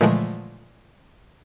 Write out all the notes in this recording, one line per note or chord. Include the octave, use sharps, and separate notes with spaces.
A#2 D3 E3 F3 G#3 A3